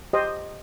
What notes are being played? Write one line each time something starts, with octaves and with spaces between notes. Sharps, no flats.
G4 C5 D#5